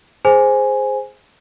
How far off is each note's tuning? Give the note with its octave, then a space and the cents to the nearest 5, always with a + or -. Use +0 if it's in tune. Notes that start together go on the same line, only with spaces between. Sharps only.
G#4 +0 C5 +0 G#5 +0